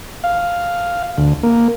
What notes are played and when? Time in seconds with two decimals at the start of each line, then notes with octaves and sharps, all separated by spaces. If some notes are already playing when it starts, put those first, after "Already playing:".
0.24 F5
1.18 D2
1.43 A#3